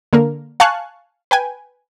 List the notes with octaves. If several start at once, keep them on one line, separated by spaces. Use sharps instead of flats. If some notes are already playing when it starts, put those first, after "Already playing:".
D3 A#3 A#4
F5 G#5 A5 C#6 F#6
B4 G5 G#5